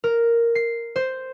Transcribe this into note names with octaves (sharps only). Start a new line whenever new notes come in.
A#4
C7
C5